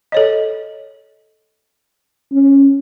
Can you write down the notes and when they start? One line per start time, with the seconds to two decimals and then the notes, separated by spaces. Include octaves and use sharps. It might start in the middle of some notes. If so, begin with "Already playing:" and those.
0.12 A4 C#5 D#5
2.32 C#4